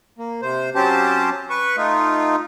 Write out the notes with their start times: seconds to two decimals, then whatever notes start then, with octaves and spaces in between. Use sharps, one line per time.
0.18 A#3
0.42 C3 C5
0.75 F#3 C4 C#4 G4 C5 A5
1.50 B4 C#6
1.77 A3 D#4 F4